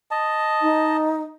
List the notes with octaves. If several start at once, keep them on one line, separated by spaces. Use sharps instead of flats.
D#5 A5
D#4